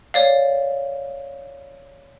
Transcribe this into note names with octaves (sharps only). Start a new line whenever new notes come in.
C#5 D5 F5